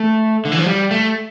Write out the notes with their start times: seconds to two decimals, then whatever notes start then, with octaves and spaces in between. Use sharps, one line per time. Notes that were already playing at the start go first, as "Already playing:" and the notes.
Already playing: A3
0.45 D3
0.52 E3
0.59 F3
0.66 G3
0.91 A3